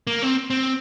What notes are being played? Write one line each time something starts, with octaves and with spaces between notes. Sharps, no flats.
A#3
C4
C4